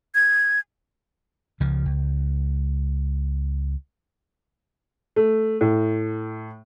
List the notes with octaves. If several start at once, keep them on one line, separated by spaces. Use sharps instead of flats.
G#6
C#2 C#3 F3
C#2
A3
A2